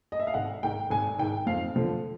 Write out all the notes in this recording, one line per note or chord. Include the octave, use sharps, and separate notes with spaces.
D#5
E5
F5
G#1 F#5
G#2 D#3 G5
G#1 G#5
G#2 D#3 G5
F2 F5
D3 F3